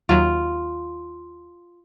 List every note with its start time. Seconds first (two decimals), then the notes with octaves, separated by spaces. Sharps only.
0.09 D#2 F#3 F4